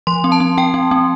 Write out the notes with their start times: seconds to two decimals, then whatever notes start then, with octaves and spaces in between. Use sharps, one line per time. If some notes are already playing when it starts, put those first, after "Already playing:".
0.07 F3 C6
0.24 C4
0.32 A5
0.40 C4
0.57 C4 G5
0.74 C4
0.91 C4